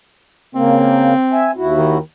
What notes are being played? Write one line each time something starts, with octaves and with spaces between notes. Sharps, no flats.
C#3 A#3 C4
E5 G#5
D#2 E4 F#4
D#3